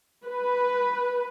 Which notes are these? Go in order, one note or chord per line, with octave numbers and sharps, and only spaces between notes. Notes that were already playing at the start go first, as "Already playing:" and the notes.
B4